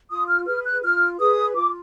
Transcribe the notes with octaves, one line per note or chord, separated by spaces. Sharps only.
F4 D#6
F6
G#4 B4 F6
F#6
F4 F6
G#4 B4 D#6
F4 D6